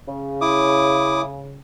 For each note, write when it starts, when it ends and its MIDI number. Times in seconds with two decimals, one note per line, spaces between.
0.08 1.59 49
0.41 1.22 64
0.41 1.22 86
0.41 1.22 87